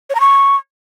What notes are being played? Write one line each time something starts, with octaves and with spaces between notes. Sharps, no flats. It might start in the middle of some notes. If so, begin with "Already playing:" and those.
C#5
A#5
C#6